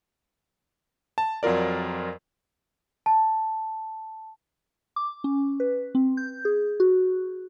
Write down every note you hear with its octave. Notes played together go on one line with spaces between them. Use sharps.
A5
F2 F#3 F4 A#4 D5
A5
D6
C#4
B4
C4
G6
G#4
F#4